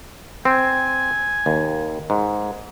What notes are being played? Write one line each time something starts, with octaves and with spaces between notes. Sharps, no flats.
C4 G#5
D#2
G#2